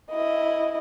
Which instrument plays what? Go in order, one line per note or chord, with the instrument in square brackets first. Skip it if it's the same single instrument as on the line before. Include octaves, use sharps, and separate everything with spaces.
[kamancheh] E4 D#5